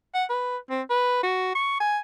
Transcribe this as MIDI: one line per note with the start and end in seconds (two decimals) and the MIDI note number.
0.14 0.24 78
0.29 0.57 71
0.70 0.82 60
0.90 1.21 71
1.23 1.54 66
1.55 1.79 85
1.80 1.98 80